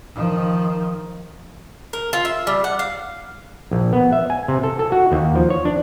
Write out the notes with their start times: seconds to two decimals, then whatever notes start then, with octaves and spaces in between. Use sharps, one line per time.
0.15 D#3 F3
1.93 A#4
2.13 F4
2.25 E5
2.47 G3
2.64 F#5
2.79 F5
3.71 A#1
3.93 B3
4.13 E5
4.30 G#5
4.48 C3
4.63 A4
4.79 A4
4.92 F#4
5.12 D#2
5.35 F3
5.50 C#5
5.65 D4